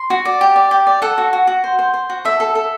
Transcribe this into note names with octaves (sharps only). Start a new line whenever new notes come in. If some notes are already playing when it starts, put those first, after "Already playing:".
Already playing: C6
F#4
D5
G4
D5
G4
D5
A4 F#5
F#4
F#4
F#4
C5
C5
C5
F#4
A4 E5
A4
A4